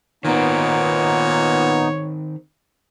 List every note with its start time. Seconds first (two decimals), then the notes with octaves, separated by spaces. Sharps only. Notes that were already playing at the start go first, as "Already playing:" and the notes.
0.25 A#2 D#3 B3 C4 D#4 C#5